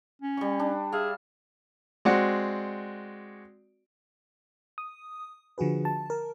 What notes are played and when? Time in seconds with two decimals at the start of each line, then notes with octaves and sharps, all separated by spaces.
0.22 C#4
0.37 G3 C#6
0.59 D4
0.92 G#4 E5 F5
2.05 G#3 C4 F#4 D5 F#5
4.78 D#6
5.58 D3 F3 F#4 G#4 B4
5.85 A5
6.10 A#4